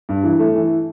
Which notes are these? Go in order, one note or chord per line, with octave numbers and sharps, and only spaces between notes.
G2
E3
A3
E3